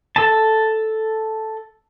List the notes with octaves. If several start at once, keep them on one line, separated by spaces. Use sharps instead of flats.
A4 A5